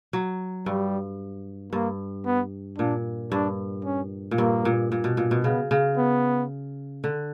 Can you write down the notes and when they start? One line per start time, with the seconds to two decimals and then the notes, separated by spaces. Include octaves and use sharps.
0.13 F#3
0.66 G2 G3
1.73 G2 A#3
2.26 B3
2.78 A#2 D4
3.32 G2 D4
3.85 C#4
4.31 A#2
4.38 G2 A#3
4.65 A#2
4.92 A#2
5.04 B2
5.17 A#2
5.31 B2
5.44 C#3 B3
5.71 C#3
5.97 B3
7.04 D3